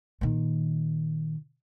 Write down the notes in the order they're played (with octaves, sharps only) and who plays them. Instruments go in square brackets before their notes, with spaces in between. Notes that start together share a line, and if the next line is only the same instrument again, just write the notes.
[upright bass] A#2 D#3